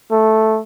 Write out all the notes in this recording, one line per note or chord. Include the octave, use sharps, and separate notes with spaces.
A3